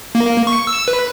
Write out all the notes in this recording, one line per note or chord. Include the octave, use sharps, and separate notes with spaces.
A#3
C#6
E6
B4